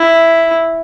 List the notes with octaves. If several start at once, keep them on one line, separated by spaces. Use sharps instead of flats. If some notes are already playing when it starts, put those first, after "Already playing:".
Already playing: E4